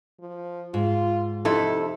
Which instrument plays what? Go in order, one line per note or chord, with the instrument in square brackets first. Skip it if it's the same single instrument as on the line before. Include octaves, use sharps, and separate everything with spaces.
[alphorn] F3
[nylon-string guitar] G#2 [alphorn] F4
[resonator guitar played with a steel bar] F2 E4 A4 [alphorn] C3 [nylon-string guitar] D#4